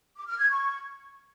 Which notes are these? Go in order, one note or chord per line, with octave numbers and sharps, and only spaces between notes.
D6
F6
G#6
C#6